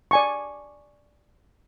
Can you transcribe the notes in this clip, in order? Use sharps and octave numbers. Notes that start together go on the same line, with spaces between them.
D5 G#5 C#6